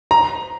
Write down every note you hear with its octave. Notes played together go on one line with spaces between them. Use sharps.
A#5